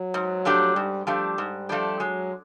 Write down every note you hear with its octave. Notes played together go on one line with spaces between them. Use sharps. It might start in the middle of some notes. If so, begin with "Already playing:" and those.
Already playing: F#3
G#2
F3 A3 D4 G4
G#2 G3
F3 G3 A3 D4 G4
G#2
F3 A3 D4 G4
F#3 G#3